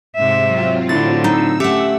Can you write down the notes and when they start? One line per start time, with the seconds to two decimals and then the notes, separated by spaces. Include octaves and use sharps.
0.16 G#2 C3 E5
0.46 F#3 C4 F4
0.89 A2 D3 E4 A6
1.24 D#4 E6
1.60 A3 C#4 G4 E5 F#5 D6